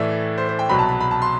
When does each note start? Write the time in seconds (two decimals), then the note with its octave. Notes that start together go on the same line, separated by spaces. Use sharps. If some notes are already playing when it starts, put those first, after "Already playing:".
Already playing: A2 E3 A3 D5 E5
0.38 C5
0.49 C5
0.59 G5
0.69 C2 B2 F#3 B5
0.79 A5
0.89 B5
1.01 B5
1.11 A5
1.22 C6